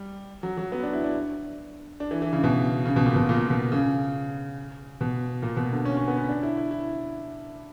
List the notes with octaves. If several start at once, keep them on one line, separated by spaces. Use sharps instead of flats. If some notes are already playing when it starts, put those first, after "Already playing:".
Already playing: G3
F#3
F#3
B3
D4
E4
D4
D4
E3
E3
C#3
B2
C#3
B2
A#2
B2
A#2
B2
C#3
B2
A#2
B2
D3
C#4
C#4
B3
C#4
D4
E4
E4
E4